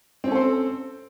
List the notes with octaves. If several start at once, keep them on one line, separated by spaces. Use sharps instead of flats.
C4 C#4 A4 C5